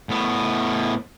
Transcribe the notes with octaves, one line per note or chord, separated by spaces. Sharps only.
A2 B3